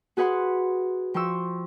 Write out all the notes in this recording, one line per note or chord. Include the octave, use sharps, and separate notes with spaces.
F#4 G#4 B4 F#5 C6
F3 G5 C6 C#6 E6